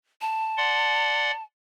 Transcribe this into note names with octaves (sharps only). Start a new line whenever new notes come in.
A5
D5 F#5 C6